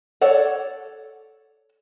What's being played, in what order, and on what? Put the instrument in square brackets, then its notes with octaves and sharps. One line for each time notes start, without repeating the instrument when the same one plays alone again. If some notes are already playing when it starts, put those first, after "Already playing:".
[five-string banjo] A4 C#5 D5 F#5